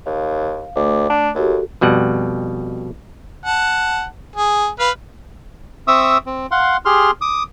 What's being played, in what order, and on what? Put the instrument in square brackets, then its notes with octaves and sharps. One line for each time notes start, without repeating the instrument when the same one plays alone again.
[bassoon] D#2 [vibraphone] F5
[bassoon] D2 [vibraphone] A3 D6
[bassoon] D4
[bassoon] D#2 [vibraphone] F#4 G4 A4
[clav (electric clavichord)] F2 B2 G3 F#5
[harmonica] F#5 A5
G#4
B4 F5
[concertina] C4 E5 C#6 D#6 E6
C4
F5 F#5 C6
G4 G#4 C6 F6
D6 D#6